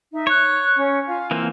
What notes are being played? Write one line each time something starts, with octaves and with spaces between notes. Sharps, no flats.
D#4 E5
C#5 F#6
C#4
F4 F5 G#5
E3 A#3 C4